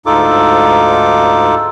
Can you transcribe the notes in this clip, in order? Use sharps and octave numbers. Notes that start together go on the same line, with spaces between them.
D2 G#2 D#4 F4 A4 D6